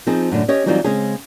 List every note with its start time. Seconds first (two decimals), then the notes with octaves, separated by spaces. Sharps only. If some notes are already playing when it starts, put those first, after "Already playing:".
0.07 F3 C4 D#4 G#4
0.31 F#2 A2 D3
0.48 C#4 G4 C#5 D#5
0.66 E3 F#3 G3 C4 D#4 F4
0.84 C#3 G#3 C4 C#4 G#4